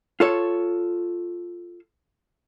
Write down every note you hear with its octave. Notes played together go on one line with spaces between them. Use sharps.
F4 A4 C#5